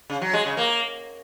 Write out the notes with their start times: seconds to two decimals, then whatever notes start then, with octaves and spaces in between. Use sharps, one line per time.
0.10 C#3
0.21 F#3
0.33 G#3
0.45 C#3
0.57 A#3